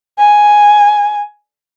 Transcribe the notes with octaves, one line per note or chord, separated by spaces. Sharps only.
G#5